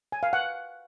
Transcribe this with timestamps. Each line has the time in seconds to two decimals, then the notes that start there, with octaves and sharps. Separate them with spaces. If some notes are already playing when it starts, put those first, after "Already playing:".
0.12 G#5
0.23 F5
0.33 F#5